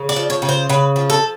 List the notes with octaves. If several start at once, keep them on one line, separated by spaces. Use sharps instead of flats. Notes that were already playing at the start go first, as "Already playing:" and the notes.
Already playing: C#3
D5
F3
C#5
C#3
C5
C#3 B4
F3
A4